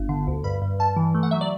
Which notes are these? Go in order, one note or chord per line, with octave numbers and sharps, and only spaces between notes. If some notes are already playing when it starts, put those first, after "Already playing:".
Already playing: G1
D3
D2
G2 B5
G2
G2 A5
E3
A3
F#5
F#3 E5
D5